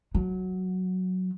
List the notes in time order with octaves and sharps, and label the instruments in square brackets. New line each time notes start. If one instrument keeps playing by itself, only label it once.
[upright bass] F#3